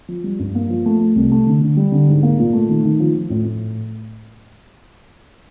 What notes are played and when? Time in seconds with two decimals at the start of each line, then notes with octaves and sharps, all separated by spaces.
0.08 F3
0.24 G3
0.39 G2
0.55 A#3
0.70 F3
0.86 A3
1.01 A3
1.16 C2
1.32 A3
1.47 D3
1.61 D3
1.77 G3
1.92 D3
2.08 G#2
2.23 A#3
2.38 A#2
2.53 A3
2.69 D#3
2.84 D#3
3.00 F3
3.14 F3
3.30 A2
3.45 A2